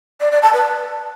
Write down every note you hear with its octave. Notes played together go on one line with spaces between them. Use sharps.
D5
D5
A5
B4